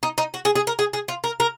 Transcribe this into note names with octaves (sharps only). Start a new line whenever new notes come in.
D#4
D#4
F#4
G#4
G#4
A#4
G#4
G#4
F4
A#4
A#4